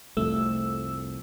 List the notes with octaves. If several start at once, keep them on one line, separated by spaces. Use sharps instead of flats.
C2 F2 A3 E6